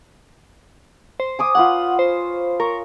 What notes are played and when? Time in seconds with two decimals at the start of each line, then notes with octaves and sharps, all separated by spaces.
1.20 C5
1.39 G#5 D6 D#6
1.55 F4 B4 C#5 F#5
1.99 C5
2.60 A#4 C#5